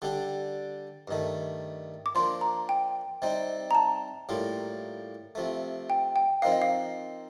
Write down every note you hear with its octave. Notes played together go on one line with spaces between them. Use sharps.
D3 G3 D4 G4
G2 D#3 A3
D6
F3 A#3 D4 C6
A#5
G5
C3 G3 C4 D#4
A#5
A5
A2 G3 A#3 F4
C3 F3 A3
G5
G5
F3 C4 D#4 A#4 F5
D#5
F5